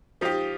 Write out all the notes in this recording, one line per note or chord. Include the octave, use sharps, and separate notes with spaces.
F3 D#4 G4